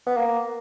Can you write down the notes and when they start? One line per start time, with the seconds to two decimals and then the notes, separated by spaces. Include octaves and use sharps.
0.06 B3
0.17 A#3